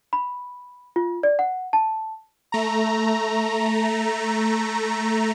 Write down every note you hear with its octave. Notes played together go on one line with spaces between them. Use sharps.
B5
F4
D5
F#5
A5
A3 A#5